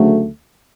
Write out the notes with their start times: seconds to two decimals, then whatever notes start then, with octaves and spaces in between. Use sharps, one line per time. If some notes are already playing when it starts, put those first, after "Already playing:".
Already playing: D2 C#3 F#3 A3